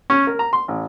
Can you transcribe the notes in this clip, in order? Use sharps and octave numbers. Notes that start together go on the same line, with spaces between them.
C#4
A#4
A#5
C6
A1